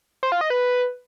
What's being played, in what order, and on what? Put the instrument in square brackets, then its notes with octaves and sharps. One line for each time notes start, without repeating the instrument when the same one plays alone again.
[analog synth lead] C5
F4
D#5
B4